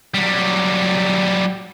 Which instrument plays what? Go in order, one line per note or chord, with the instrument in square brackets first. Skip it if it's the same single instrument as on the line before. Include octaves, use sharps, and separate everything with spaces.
[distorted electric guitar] F#3 G3